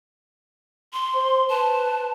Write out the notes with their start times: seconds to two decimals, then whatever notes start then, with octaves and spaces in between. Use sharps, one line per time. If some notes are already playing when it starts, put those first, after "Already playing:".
0.93 C6
1.14 C5
1.50 B4 A5